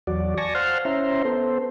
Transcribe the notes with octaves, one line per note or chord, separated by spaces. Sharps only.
E2 F#3 F#4 D5
D5 G#5 A5 C#6 A#6
C5 F5 F#5 A5 C6 F6
C#4 E4 C5 E5 A#5 C6
B3 A4 C5